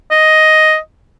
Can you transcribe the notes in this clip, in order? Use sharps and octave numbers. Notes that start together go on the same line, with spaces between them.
D#5